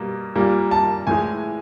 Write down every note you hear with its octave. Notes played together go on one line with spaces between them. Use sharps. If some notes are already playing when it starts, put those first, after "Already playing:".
Already playing: B2 G3 A#3
A#2 G3 A#3
A5
A2 E3 G#3 G#5